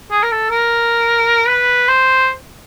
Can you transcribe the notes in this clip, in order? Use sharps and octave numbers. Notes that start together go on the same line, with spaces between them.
G#4
A#4
A4
A#4
B4
C5